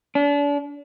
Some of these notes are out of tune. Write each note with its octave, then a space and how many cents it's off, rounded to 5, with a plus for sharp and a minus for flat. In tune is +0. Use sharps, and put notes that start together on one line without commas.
D4 -35